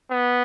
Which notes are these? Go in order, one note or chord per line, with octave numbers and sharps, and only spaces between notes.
B3